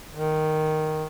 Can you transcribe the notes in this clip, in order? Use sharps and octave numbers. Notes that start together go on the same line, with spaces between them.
D#3